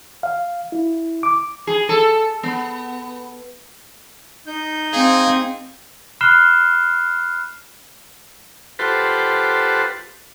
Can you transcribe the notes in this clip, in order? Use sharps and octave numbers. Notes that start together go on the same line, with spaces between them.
F5
E4
D6
G#4
A4
B3
D#4 G6
C4 G#4 F5
B5 F6 F#6 C7 E7 G7
F4 G4 A4 B4 C5 F#5